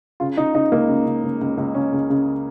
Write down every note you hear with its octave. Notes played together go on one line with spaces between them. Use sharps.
C#3 F4
C#3 D#4
C#3 D#4
C#2 A#3
C#3
C#3
C#2
C#2
C#2
C#3 C#4
C#2
C#3